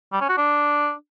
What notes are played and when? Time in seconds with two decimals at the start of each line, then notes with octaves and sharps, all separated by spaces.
0.12 G3
0.21 C#4
0.29 F#4
0.38 D4